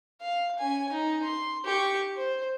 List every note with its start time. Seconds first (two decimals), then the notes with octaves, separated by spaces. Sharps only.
0.21 F5
0.59 C#4 G#5
0.92 D#4
1.24 C6
1.65 G4 C#6
2.17 C5